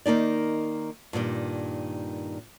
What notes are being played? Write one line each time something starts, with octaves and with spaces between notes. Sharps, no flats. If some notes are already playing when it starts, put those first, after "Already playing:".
D#3 A#3 D#4 D5
G2 A#2 D#3 G3